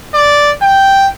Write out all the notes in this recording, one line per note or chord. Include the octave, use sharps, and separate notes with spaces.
D5
G5